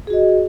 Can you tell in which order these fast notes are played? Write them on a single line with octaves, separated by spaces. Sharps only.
G#4 F#4 D#5